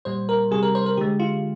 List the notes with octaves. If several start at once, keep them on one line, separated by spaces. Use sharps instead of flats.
A#2 G3 C5
A#4
C3 G3 G#4
A#4
C5
A#4
D3 G#3 G4
F4